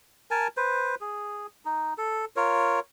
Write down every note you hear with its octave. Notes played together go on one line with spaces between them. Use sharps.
A#4 G#5 A5
B4 C5
G#4
D#4
A4
F4 A#4 C#5